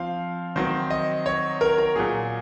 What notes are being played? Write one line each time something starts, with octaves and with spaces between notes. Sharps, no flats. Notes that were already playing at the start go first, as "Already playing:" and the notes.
Already playing: F3 C4 F5
D#3 F#3 C4 C5
D#5
C#5
A#4
A#4
A#2 F#3 A#3 G#4